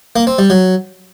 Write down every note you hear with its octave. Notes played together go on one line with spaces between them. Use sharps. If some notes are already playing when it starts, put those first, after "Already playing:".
A#3
C4
G3
F#3